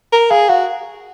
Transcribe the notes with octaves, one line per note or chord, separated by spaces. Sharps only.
A#4
G#4 F5
F#4 F5